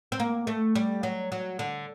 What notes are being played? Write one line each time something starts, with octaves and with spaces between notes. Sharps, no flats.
C4
A#3
A3
G3
F#3
F#3
D3